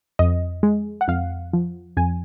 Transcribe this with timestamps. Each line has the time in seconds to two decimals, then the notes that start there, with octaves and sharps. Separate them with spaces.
0.19 F2 D#5
0.63 G#3
1.01 F#5
1.08 F2 F5
1.53 F3
1.97 F2 G#5